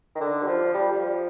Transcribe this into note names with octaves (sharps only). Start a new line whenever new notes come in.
D#3
D3
G3
F3
G3
G3
F3